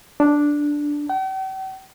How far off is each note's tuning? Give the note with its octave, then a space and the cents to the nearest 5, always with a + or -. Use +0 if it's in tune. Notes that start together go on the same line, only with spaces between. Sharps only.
D4 +0
G5 -45